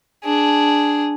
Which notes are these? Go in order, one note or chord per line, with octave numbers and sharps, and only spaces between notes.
D4 G#4